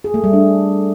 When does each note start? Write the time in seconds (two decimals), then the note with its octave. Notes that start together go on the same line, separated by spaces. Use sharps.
0.04 G#4
0.14 A3
0.24 G3
0.33 D4